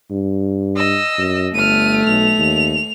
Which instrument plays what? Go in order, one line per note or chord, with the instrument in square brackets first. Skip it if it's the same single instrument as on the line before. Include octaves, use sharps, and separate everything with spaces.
[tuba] G2
[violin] D#5 E6
[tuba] F#2
[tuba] G1 [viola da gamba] A3 [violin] F6 D#7
[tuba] B1 [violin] F7
[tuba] D#2